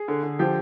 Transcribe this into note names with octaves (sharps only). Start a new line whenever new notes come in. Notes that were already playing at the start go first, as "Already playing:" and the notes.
Already playing: G#4
D3
D3
F3 G4